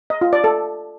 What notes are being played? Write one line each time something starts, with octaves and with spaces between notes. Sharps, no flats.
D#5
F4
D5
A4